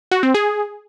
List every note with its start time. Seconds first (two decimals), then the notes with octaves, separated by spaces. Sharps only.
0.11 F#4
0.23 C4
0.34 G#4